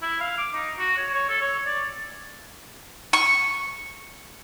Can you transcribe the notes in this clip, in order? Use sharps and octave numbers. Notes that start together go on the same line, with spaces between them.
E4
F5
D6
D#4
F#4
C#5
C#5
A4
C#5
D5
C#6